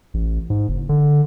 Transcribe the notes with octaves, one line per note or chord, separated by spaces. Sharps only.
A1
G#2
F#1
D3